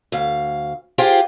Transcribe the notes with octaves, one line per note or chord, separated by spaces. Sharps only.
D2 F5
F4 G4 G#4 C5 F5 G5